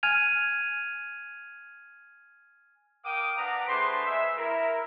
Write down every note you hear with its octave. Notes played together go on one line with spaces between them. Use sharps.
G#5 F6 G#6 D#7 F7
A#4 F5 G5 D6 D#6
D4 B4 F#5 A#5 D6
A3 D4 G#4 B4 C5 C6
G#3 G#4 B4 E5
E4 A#4